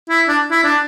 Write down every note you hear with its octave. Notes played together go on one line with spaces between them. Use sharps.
E4
D4
E4
D4